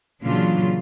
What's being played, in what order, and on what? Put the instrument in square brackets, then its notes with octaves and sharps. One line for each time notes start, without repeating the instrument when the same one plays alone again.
[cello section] A#2 C#3 E3 F#3 D4 F4